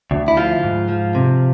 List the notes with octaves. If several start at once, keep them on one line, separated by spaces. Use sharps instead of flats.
D2
E4
F3 F4
G#2
F3
C3